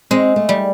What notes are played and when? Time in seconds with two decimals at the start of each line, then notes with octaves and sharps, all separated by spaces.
0.11 G#3 C4
0.36 A3
0.49 G3